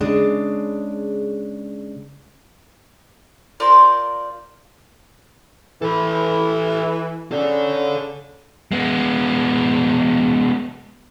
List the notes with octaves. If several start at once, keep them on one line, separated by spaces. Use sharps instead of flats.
C#3 G#3 D4
F4 A#4 C5 D5
E3 A4 B4
C#3 A4 D5
G#3 B3